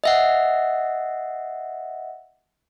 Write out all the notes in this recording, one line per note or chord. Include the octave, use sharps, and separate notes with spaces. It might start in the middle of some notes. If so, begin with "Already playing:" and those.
D#5 E5 F#5